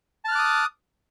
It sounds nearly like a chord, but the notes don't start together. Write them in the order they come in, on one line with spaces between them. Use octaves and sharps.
A5 F6 F#6 D6 D#6